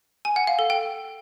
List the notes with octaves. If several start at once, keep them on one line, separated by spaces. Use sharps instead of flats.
G#5
F#5
F5
A4
G5